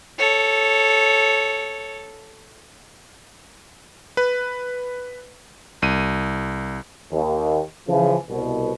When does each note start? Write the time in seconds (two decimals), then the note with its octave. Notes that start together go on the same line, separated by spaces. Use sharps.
0.19 A4 C#5
4.17 B4
5.82 C2 D#7
7.12 D#2
7.88 C#3 E3 F3
8.29 C2 B2